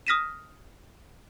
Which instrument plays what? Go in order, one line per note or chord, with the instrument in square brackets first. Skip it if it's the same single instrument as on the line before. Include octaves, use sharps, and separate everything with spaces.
[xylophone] D#6 F6 A#6 B6 D#7 E7